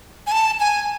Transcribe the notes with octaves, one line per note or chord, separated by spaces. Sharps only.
G#5
A5
G#5